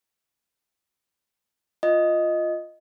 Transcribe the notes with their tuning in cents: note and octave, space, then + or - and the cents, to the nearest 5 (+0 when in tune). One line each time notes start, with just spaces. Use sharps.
F4 +0 D#5 +0